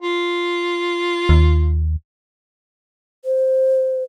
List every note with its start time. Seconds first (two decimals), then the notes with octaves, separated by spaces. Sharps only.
0.02 F4
1.29 D#2
3.25 C5